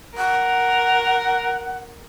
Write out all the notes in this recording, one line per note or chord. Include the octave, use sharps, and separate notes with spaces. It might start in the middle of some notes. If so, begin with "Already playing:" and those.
A#4 F#5